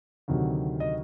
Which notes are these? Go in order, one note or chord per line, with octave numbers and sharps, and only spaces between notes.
D2 C3 D#3 F#3
D#5